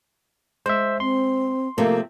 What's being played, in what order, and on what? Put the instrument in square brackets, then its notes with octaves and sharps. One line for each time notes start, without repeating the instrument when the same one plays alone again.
[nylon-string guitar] G#3 [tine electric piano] C5 E5
[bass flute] C4 [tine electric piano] C6
[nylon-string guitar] C3 F3 A3 [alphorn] A#3